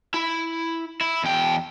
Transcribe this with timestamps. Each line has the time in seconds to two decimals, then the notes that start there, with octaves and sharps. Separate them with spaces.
0.14 E4
1.01 E4
1.24 E2 G5